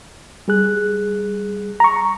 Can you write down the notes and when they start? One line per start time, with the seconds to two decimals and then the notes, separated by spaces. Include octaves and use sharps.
0.48 G3 G#4 F#6
1.80 A#5 C#6